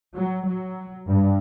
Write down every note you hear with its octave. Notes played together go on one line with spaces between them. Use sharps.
F#3
F#3
G2